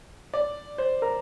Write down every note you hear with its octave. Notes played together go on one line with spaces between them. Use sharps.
D5
C5
A#4